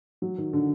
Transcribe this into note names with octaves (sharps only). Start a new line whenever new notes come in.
F#3
D#3
D3